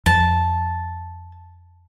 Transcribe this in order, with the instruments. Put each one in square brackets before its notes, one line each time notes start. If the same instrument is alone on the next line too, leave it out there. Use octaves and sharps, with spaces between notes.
[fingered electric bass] F2 [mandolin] A5